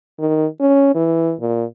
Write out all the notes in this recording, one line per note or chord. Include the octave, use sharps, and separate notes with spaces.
D#3
C#4
E3
A#2